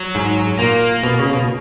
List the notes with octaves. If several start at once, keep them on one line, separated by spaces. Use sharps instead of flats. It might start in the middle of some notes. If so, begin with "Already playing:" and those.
Already playing: F#3
G#2
A#2 A#3
B2
C#3
B2